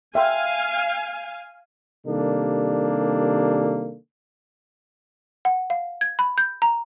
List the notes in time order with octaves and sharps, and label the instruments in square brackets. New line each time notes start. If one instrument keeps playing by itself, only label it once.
[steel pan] E5 G5 C6 [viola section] F5 G#5
[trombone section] C3 D#3 G3 A#3 D4 A4
[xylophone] F#5
F5
G#6
B5
G6
A#5